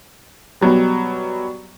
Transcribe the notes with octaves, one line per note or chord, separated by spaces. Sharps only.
B2 F#3 G3